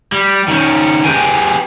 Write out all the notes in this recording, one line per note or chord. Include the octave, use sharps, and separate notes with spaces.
G3
D#3 C#4
G4 G#4 B4 G5 G#5